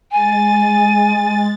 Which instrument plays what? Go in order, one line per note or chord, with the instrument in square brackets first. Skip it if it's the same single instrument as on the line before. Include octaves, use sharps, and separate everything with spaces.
[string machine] G#3 A6 [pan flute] G#5